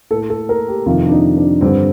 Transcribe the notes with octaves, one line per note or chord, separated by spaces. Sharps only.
A2 A4
A4
A#4
G4
F2 C3 D#3 F4
D4
D#4
D4
G2 D3 C4